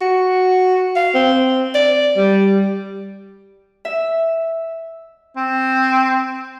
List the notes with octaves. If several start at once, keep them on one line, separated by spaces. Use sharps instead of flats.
F#4
F5
C4
D5
G3
E5
C4